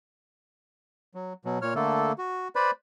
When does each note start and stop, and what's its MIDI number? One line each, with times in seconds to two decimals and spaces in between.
1.15 1.33 54
1.45 1.59 47
1.45 1.59 54
1.62 1.74 46
1.62 1.74 73
1.62 1.74 89
1.75 2.12 50
1.75 2.12 57
1.75 2.12 58
1.75 2.12 69
2.18 2.48 66
2.55 2.71 71
2.55 2.71 72
2.55 2.71 74
2.55 2.71 83